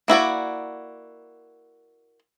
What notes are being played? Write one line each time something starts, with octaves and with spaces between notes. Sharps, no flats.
A#3 E4 F#4 D5